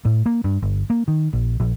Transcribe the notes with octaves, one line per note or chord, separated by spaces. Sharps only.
A2
A#3
G2
G1
A#3
D#3
A#1
A#1